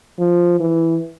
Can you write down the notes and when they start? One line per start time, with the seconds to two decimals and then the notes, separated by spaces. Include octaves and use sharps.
0.18 F3
0.60 E3